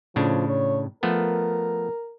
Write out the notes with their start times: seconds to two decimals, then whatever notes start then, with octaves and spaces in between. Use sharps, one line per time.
0.16 A2 C#3 F3 D4
0.48 C#5
1.03 F3 A3 B3 A#4